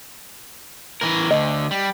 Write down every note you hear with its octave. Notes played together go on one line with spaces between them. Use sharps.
E3 A#4
D2 D3 D#5
G3